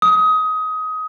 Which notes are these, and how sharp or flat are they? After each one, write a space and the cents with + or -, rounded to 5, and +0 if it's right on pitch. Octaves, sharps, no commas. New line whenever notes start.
D#6 +20